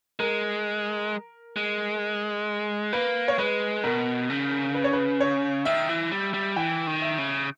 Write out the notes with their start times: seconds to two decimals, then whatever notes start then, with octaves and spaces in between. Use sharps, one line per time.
0.19 G#3 A#4
1.56 G#3
2.93 A#3 B4
3.28 C#5
3.39 G#3 B4
3.84 B2 A#4
4.30 C#3
4.75 B4
4.84 C#5
4.93 B4
5.20 C#5
5.65 D#3 E5
5.89 E3
6.12 G3
6.34 G3
6.56 E3 G5
6.87 D#3
7.02 E5
7.18 C#3